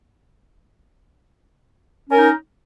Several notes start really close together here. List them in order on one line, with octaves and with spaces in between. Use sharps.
C#4 A#4 D#4